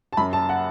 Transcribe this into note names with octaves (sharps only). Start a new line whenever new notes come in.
A5
F#2 B5
A5
F#5